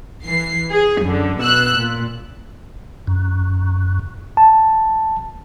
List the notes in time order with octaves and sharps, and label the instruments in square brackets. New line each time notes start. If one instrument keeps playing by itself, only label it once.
[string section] E3 C7
G#4
F#2 D3
B2 E6 F#6
A#2
[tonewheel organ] F#2
[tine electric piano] A5